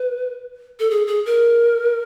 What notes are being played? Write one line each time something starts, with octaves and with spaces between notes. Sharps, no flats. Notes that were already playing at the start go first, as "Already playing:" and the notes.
Already playing: B4
A4
G#4
G#4
A#4